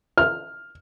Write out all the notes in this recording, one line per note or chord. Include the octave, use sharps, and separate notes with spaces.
F6